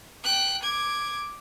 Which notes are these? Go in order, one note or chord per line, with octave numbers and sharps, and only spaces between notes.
G5 F#6
D6 G#6